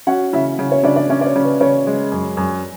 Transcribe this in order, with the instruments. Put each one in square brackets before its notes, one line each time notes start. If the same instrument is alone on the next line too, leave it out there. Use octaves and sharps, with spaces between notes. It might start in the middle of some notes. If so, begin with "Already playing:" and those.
[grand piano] C#4 [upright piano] F#4 F#5
[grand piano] C#3 [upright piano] E4 E5
[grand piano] C#3
[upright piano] C#5
[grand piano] C#3 [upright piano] D4 D5
[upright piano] D4 D5
[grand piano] C#4 [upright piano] D4 D5
[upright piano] D5
C#5
[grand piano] C#3
[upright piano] B4
[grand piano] C#3 [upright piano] C#5
[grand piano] G#3
F#2
F#2